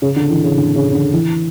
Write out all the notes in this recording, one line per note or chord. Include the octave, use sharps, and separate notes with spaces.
C#3
D3
E3
C#3
D3
C#3
C#3
D3
E3